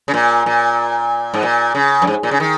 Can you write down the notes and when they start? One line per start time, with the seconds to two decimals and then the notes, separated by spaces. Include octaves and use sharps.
0.08 C#3
0.14 A#2
0.46 A#2
1.34 G#2
1.43 A#2
1.75 C#3
2.02 F#2
2.07 G#2
2.23 A#2
2.31 C#3
2.40 D#3